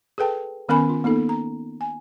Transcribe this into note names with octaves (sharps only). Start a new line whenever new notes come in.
G#4 A4 B4 G5 A5
D#3 B3 C#4 A#4 G#5 B5
F4
A#3 B3 D#4 A4
A#5
G#5